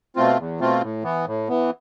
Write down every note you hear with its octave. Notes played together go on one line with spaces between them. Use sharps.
B2 A3 C4 F4
E2
B2 A3 C4 F4
A2
E3 B3
A2
E3 B3